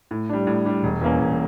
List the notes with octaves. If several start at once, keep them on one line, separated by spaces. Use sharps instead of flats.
A2
G3 D4
A2
G3 D4
E1
E2 E3 A#3 C#4
E1